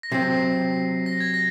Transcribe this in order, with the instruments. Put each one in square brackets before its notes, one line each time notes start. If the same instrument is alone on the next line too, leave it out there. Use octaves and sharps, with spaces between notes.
[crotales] A#6
[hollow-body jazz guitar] C3 F#3 C4 [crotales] C7
[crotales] A#6
G#6
A#6